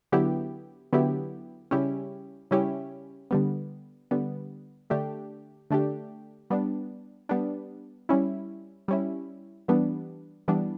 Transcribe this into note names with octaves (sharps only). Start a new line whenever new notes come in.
D3 F#3 B3 E4 G4
D3 F#3 B3 E4 G4
C#3 G3 C#4 E4 G4
C#3 G3 C#4 E4 G4
D3 G3 B3
D3 G3 B3
D3 A3 D4 G4
D3 A3 D4 G4
G3 B3 D4
G3 B3 D4
G3 C#4 E4
G3 C#4 E4
E3 G3 B3 D4
E3 G3 B3 D4